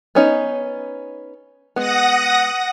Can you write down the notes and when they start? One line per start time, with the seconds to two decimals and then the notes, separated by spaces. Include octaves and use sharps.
0.15 B3 C#4 D#4
1.76 G#3 B3 F#5 D#6 A#6